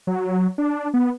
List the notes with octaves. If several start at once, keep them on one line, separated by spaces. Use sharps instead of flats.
F#3
D4
B3